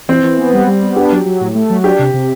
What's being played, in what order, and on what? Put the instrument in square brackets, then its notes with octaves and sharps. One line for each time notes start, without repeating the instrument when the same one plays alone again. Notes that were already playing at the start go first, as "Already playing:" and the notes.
[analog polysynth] E3 [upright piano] C4
[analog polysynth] E3
B3
G3
G3
B3
[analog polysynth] D4 [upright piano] G4
[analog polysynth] F#3
F#3
A2
A3
F#3
[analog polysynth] D4 [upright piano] G4
[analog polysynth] C3
C3